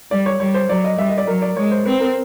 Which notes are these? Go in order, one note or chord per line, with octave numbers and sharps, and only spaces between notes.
G3 D5
C#5
G3 C#5
C5
F#3 D5
D#5
G3 E5
D#5
D5
F#3 A#4
D5
G#3 C#5
C5
C4 B4
A#4